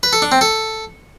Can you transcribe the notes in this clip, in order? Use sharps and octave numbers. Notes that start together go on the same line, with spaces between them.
B4
A4
D4
C4
A4